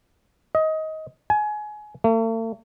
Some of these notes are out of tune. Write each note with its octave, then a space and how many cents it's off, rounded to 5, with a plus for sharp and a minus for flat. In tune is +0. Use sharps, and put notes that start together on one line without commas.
D#5 +20
G#5 +25
A3 +45